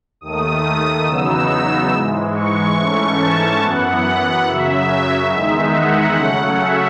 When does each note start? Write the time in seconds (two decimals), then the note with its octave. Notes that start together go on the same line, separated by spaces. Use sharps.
0.21 D#2 D#3 A3 D#6
1.06 E2 C#3 F#3 B3 D#4 E6
1.91 G#2 E3 G#3
2.33 C#6
2.76 G#2 E3 A3 C#4 C#6
3.18 A5
3.61 F#2 E3 B3 F#5
4.03 F#5
4.46 F#2 C#3 F#3 E5
5.31 E2 D#3 G#3 D#4
5.73 F#5
6.16 C#3 F#3 A3 C#4
6.58 E5